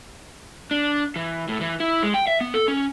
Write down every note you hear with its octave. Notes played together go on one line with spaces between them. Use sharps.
D4
E3
A2
E3
E4
G#3
G5
E5
B3
A4
C#4